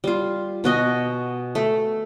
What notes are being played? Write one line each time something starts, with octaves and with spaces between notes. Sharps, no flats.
G3 F4
B2 F#4 D#5 G#5
A3